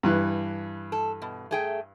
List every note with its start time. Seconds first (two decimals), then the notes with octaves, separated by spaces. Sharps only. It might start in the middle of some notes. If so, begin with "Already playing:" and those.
0.03 G2 E3 F#6
0.92 A4
1.22 B2
1.51 A3 G#4 G5